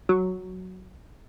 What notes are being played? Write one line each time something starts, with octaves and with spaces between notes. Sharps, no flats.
F#3